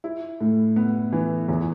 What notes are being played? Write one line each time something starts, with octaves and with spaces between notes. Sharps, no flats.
E4
A2
B3
E3
E2